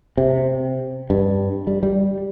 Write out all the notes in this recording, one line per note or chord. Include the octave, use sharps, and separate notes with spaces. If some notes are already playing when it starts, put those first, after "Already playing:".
C3
G2
G3
G3